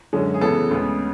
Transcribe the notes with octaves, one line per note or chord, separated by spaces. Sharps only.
F#2 D3 G#3 C#4
G#4
C#3 E3 B3 A4
D2 C#3 G#3 B3